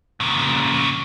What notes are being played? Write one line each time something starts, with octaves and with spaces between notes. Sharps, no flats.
A#2 C#3